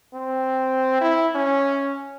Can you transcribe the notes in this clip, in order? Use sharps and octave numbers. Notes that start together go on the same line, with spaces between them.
C4
E4
C#4